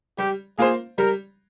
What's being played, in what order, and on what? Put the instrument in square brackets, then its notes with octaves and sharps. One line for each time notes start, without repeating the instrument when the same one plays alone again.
[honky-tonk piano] G3 [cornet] G4
[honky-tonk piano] A#3 F4 C5 [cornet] G#4
[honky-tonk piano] G3 [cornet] A#4